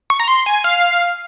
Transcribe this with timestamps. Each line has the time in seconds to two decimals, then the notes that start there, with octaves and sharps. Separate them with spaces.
0.10 C#6
0.20 A#5
0.28 C6
0.46 G#5
0.64 F5